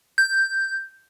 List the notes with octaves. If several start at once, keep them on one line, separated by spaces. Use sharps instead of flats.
G6